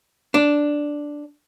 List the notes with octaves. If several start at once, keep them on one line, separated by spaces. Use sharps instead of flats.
D4